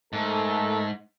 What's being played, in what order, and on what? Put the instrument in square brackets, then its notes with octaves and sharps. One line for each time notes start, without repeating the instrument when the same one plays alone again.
[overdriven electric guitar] G#2 [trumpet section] A3 A4 A#4